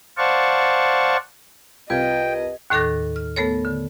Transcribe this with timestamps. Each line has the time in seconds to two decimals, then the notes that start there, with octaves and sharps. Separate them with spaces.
0.18 C5 D5 F5 F#5 A5 C#6
1.90 C2 F4 B4 D#5 G5 G#6
2.70 D#2 A2 D#3 A4 D6 A#6
3.16 F6
3.36 A3 B3 A4 A#4 C#5
3.65 D3